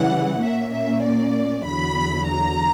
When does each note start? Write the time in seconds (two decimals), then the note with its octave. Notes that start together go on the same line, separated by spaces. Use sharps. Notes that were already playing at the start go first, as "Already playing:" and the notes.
Already playing: C#3 E3 G3 F#5
0.43 A#2 A#3 C#4 E5
0.74 E5
1.04 D5
1.67 E2 D3 F#3 B5
2.29 A#5